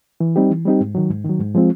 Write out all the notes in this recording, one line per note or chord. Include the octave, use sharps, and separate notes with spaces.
E3
G3 C4 D#4 G4
E3
G3 C4 D#4 G4
G#2
D#3 F#3
G#2
D#3 F#3
G#2
F3 G#3 C4 F4